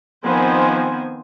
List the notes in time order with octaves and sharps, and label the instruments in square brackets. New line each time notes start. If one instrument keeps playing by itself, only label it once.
[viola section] D#3 F3 B3 C4 C5 G#5